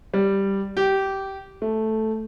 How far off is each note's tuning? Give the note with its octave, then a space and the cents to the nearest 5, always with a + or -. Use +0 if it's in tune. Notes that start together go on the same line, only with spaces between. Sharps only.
G3 +0
G4 -15
A3 -5